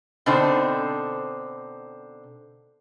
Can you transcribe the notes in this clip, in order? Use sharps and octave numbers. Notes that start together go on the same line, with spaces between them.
B2 D3 C4 D4 D#4 C5